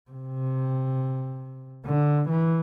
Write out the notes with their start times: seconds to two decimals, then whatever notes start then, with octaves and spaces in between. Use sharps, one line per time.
0.11 C3
1.85 D3
2.29 E3